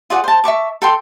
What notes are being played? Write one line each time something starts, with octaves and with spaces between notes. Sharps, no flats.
F4 G#4 D5 F#5
C5 A5
E5 A5 C#6 D6
A4 G5 C6